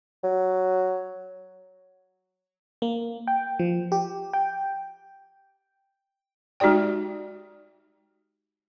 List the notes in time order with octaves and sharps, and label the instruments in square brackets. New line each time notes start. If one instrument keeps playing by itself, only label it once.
[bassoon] F#3
[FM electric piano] A#3
G5
F3
G4
G5
[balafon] G#3 D#4 F#4 G4 D5 G5